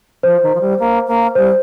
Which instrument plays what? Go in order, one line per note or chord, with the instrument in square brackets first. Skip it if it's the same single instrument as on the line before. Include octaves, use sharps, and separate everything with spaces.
[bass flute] F3 [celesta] C5
[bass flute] D#3
F3
G3
A#3
A#3
[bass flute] G3 [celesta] C5